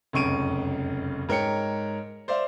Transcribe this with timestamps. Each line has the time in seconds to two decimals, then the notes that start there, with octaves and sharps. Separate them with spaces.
0.13 F1 C#2 F#2 C#6 D7 D#7
1.29 G#2 A#4 C#5 G5 C#7
2.28 C5 D5 E5 F5